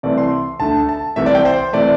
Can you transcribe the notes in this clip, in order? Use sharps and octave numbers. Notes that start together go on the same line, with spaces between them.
C2 C3 E3 A3 D5
C6
D2 D3 A3 A5
A5
C2 C3 E3 A3 E5
D5
G5
C5
C3 E3 A3 D5